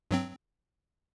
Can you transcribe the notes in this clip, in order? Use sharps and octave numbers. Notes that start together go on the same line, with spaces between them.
G2 F#3 C4